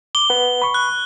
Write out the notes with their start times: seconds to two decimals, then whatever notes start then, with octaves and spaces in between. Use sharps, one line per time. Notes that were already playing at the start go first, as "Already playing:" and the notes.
0.15 D6 G7
0.30 B4 F#5
0.62 B5 C#6
0.74 F#6